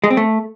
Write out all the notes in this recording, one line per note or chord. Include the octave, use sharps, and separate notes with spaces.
G#3
C4
A3